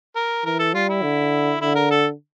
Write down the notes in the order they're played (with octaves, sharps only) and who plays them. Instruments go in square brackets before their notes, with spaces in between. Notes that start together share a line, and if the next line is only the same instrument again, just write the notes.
[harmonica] A#4
[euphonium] E3 [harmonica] A#4
[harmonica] A4
[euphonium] G3 [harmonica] F4
[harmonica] E4
[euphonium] D3
[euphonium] D3 [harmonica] E4
[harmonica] A#4
A4